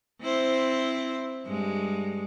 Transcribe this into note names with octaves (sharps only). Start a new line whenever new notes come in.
C4 E4 C5
G2 G#3